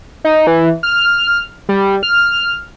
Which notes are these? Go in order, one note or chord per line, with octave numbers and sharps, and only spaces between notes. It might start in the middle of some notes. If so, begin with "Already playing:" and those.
D#4
E3
F6
G3
F6